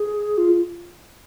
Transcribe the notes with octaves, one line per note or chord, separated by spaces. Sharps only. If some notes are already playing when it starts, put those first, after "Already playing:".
Already playing: G#4
F4